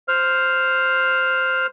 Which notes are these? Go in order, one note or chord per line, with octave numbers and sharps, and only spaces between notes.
C5 F6